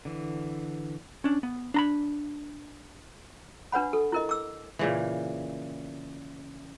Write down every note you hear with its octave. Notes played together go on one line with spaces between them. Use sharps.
D3 E3
C#4 D4
B3
D4 A#5 B5
D4 B4 C#5 F#5 B5
A4
E4 A#4 D#5
D6 E6
A#2 C#3 E3